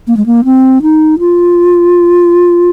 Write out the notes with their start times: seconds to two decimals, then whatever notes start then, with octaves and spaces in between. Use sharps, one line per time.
0.07 A#3
0.17 G#3
0.26 A#3
0.45 C4
0.82 D#4
1.19 F4